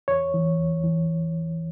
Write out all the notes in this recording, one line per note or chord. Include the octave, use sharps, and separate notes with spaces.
E2 C#5
E3
E2
E3